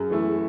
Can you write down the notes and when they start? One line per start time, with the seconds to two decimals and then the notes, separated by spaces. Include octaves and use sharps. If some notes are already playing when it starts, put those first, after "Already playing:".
Already playing: F#2 G#4
0.10 E3 A3 E4